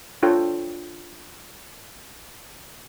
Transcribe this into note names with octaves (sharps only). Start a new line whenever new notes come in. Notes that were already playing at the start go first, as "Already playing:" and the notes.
D4 F4 A4 C#5 G5